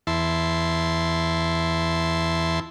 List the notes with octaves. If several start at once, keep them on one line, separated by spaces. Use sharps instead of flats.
E2 E4 A5 C6